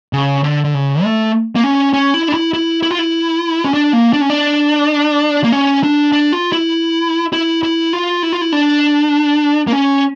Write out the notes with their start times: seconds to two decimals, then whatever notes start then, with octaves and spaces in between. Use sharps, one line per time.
0.13 C#3
0.44 D3
0.64 D3
0.74 C#3
1.03 A3
1.56 A#3
1.64 C#4
1.93 C#4
2.14 E4
2.28 D4
2.34 E4
2.54 E4
2.83 E4
2.91 F4
2.99 E4
3.64 C#4
3.74 D4
3.93 A#3
4.13 D4
4.21 C#4
4.30 D4
5.44 A#3
5.52 C#4
5.83 D4
6.12 D4
6.33 F4
6.52 E4
7.33 E4
7.63 E4
7.93 F4
8.23 E4
8.33 F4
8.41 E4
8.52 D4
9.67 A#3
9.72 C#4